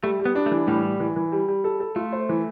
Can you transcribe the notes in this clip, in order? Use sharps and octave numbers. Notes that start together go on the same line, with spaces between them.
G3 A3
G3
B3
D4
A3
E3
A2 G3
A2
E3
E3
G3
G3
A4
A4
A3 F4
C5
E3